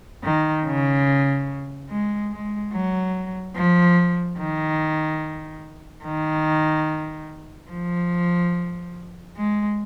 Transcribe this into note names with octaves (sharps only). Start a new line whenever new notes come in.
D#3
C#3
G#3
G#3
F#3
F3
D#3
D#3
F3
G#3